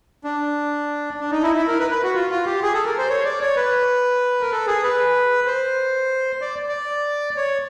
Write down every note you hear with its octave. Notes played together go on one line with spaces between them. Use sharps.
D4
D4
D#4
E4
E4
A#4
B4
B4
F#4
F4
F4
G4
G#4
A4
A#4
C5
C#5
D5
C#5
B4
A#4
A4
G#4
B4
C5
D5
D5
C#5